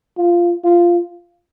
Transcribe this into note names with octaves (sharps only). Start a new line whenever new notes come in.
F4
F4